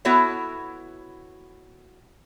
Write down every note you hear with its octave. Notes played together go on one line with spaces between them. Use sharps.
B3 E4 F#4 A4 C#5 E5